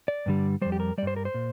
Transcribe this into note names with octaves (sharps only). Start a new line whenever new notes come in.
D5
G2 D3 G3
F2 C3 G3 C5
G4
A#4
G2 G3 C5 D5
A#4
C5
A#2